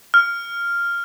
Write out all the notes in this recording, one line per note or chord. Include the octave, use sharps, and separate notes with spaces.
F6